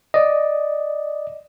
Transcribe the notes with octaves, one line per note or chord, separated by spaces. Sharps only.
D5 D#5